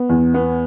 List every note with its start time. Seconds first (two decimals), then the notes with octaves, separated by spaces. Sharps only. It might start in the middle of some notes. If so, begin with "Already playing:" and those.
Already playing: B3
0.09 E2
0.34 B3